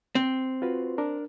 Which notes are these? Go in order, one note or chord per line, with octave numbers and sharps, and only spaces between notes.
C4
F4 F#4 B4
D4 A#4